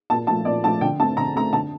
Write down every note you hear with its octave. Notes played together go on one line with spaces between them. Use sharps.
A#2 A5
F3 A3 A5
A#2 D5
F3 A3 A5
D3 G5
A3 C4 A5
D3 A#5
A3 C4 A#5
D3 A5